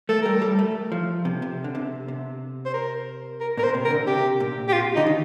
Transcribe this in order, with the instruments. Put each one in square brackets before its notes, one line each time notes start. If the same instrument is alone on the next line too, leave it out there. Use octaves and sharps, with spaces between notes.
[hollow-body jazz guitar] A3 [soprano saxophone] A4
[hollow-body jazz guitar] G3 [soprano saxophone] A#4
[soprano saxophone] A4
[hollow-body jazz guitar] G3
A3
F3
C3
C3
D3
C3
C3
[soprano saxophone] C5
A#4
A#4
[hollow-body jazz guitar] A#2 [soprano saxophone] A#4
[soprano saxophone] C5
[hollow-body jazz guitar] C3
[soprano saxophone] A#4
[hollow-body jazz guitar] D3
[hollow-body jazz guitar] C3 [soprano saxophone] G4
[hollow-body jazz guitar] A#2
[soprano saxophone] G4
F4
[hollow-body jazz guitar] D3 [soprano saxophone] D#4
[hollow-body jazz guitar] D#3